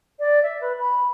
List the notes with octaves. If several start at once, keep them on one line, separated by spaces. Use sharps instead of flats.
D5
E5
B4
B5